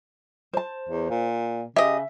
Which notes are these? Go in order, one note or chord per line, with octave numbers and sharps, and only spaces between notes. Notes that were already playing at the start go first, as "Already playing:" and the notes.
C5 A5
E2
A#2
C#3 G4 D#5 E5